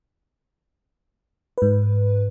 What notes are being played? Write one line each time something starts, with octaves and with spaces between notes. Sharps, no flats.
G#2 B4